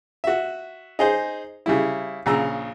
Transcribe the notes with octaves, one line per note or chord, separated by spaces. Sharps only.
F#4 E5
D#4 G#4 C5
C#3 G3 E4
A#1 C#3 A#5 E6